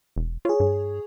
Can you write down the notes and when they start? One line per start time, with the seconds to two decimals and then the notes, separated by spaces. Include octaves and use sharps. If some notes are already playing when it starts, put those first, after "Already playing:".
0.16 E1
0.45 F4 G#4 C#5
0.60 G2